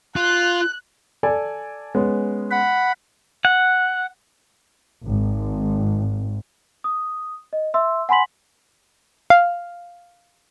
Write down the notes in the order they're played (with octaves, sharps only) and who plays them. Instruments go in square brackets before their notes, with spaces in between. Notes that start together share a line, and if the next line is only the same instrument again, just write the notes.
[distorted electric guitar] F4 [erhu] F#6
[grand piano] A4 D5 G#5
G#3 B3 C#4
[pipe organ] F#5 B5
[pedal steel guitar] F#5
[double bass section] G#1
[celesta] D#6
D#5
E5 C6 E6
F#5 G#5 B5 C6 B6 F#7
[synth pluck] F5